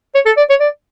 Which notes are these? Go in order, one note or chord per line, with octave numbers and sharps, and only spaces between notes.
C#5
A4
D5
C#5
D5